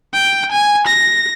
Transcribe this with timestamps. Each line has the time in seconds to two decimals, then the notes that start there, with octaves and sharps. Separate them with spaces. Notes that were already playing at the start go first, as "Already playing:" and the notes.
0.13 G5
0.52 G#5
0.87 A#6